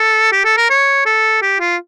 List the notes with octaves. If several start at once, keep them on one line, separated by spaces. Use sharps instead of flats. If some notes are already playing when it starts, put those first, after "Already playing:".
Already playing: A4
G4
A4
A#4
C#5
A4
G4
F4